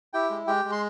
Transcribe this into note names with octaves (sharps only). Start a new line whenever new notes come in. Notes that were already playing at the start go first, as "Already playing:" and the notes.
E4 G4 G5
G#3
G#3 G4 G5
G#3
C6